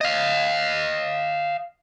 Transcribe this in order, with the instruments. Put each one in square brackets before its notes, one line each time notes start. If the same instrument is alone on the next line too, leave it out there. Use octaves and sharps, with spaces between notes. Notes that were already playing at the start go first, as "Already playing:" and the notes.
[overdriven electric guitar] D#5 F5